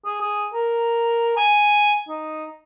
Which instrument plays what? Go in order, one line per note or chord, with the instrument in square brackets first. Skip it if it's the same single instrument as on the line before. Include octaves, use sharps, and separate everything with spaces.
[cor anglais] G#4
G#4
A#4
G#5
D#4